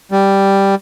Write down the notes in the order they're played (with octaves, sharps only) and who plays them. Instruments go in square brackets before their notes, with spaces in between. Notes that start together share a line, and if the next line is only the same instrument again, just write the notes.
[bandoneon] G3